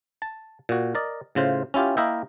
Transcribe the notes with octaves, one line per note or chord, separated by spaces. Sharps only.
A5
A#2 F#4
A#4 D5 D#5
A2 C#3 F4 C5
C#4 E4 F4 G4
A#3 E4 A#4 D#5 E5 G5